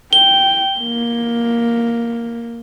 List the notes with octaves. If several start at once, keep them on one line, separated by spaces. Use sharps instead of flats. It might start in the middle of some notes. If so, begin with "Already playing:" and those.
G5 G7
A#3